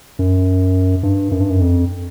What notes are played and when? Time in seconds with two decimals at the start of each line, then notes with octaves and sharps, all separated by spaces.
0.19 F#2
1.03 G2
1.31 F#2
1.40 G2
1.50 F#2
1.61 F2